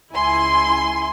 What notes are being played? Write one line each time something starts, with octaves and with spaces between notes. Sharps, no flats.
C#2 E4 G#5 C6